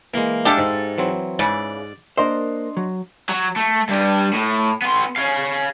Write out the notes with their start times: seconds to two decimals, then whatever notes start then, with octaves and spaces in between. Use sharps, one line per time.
0.14 E3 G#3 A#3
0.45 G#3 D4 G4 A4 E5 F5
0.58 G#2
0.98 E3 F#3 C4
1.39 G#2 C#3 E3 D5
2.17 A#3 D4 A#4 C5 D#5 C6
2.77 F#3
3.29 F#3
3.56 A3
3.89 G2 G3
4.33 A2
4.82 B3 C6
5.16 C#5 F5